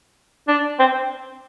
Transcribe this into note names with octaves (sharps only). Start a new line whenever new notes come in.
D4
C4